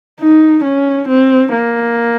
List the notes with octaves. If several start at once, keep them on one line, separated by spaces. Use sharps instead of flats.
D#4
C#4
C4
A#3